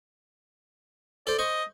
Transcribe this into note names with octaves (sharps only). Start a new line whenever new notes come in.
A4 C5 D5
C5 D#5 C#6